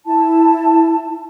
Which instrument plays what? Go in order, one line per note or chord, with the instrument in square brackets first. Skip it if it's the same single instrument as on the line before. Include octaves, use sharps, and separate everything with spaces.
[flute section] E4 A5